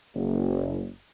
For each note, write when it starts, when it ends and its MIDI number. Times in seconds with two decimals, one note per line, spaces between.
0.15 0.86 30